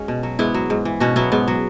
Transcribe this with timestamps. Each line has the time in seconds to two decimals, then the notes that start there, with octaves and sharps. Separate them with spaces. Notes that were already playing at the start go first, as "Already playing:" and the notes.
Already playing: G#3 C#4 F#4
0.08 B2
0.23 F#3
0.39 G#2 B3 E4
0.54 F#3
0.70 G#2
0.85 E3
1.00 B2 C#4 F#4
1.16 F#3 B3 E4
1.32 G#2 B3
1.48 F#3